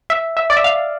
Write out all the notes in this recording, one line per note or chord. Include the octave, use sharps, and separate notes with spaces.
E5
E5
D5
E5
F5